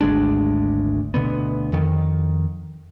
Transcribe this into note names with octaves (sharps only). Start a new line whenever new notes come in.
G#1 D2 G#3 D4
D2 B2 D3 B3
F2 D#3